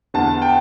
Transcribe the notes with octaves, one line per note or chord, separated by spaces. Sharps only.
E2 D3 B3 A5
G5